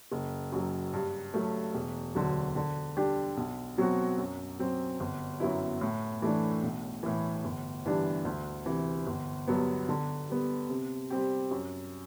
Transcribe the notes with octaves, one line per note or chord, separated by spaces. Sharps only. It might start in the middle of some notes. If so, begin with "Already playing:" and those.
F#1
F#2 F#3
G2
F#3 A3
E1
D2 D3 F#3
D3
G3 D4 G4
B1
B2 F#3 C4 F#4
F#2
F#3 C4
G1
F#2 F#3 B3 E4
A2
E3 A3 D4
B1
A2 E3
G1
G2 E3 G3 D4
D2
C3 E3
G1
G2 F#3 B3
D3
G3 B3
C3
G3 C4 G4
F#2